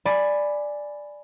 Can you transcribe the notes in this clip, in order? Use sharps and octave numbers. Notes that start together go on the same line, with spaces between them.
D5 G#5 B5